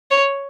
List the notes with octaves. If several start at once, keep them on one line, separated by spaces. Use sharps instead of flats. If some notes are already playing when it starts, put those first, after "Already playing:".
C#5